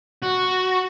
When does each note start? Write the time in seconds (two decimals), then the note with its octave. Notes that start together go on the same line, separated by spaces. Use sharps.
0.23 F#4